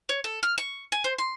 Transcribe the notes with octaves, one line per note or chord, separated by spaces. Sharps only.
C#5
A4
F6
C#6
G#5
C5
C6